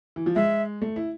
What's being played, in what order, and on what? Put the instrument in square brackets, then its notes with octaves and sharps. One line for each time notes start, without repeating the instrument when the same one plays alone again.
[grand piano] E3
F3
[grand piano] G#3 [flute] E5
[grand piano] A3
E4